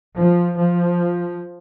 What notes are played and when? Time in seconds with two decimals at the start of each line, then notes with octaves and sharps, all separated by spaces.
0.17 F3
0.59 F3